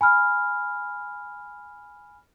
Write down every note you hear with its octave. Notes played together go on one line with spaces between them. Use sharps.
G#5 B5 F6